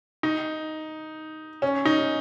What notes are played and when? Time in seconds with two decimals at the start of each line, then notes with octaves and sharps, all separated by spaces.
0.23 D#4
1.62 C#4
1.85 D#4